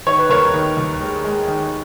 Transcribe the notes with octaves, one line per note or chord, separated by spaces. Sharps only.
D#3 C#5
B4
D#2 A#4 C#5
D#3
D#2
G#3
G#3
D#3